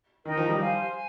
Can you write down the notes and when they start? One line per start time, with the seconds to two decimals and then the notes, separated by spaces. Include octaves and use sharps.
0.25 D#3 D#4 A#4 D#5 G5
0.37 F3
0.48 G3
0.60 C5 F5 G#5
0.93 G#5